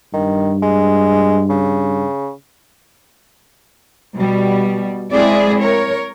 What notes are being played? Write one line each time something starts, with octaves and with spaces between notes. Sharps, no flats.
G2 D#3
G#3
C#3
B2 G3
G#3 C4 E4 G#4 D5
A#4 C#5